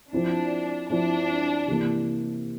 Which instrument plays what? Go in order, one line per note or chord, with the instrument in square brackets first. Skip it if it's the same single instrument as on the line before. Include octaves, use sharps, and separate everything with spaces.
[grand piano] F3 C4 E4 [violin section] D4
[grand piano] F3 C4 E4 [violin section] D4
[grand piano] C3 E3 A#3